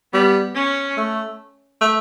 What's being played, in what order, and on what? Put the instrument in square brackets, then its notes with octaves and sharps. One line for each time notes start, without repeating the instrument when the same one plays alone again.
[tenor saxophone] G3 [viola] B3
[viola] C#4
[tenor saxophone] A3
A3